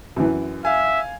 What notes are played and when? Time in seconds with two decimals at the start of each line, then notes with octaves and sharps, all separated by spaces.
0.16 F#2 E3
0.65 E5 F5 G#5